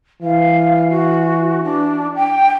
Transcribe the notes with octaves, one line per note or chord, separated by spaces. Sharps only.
E3 F5
F#4
D4
G5